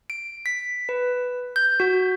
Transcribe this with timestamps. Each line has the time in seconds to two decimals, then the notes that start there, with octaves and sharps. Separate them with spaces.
0.10 D7
0.46 B6
0.89 B4
1.56 G6
1.80 F#4